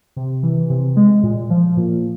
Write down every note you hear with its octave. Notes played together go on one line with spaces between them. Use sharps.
C3
E3
C3
G#3
A#2
F3
A#2